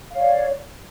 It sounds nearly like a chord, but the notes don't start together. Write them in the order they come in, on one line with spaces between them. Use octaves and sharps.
F5 C#5 D5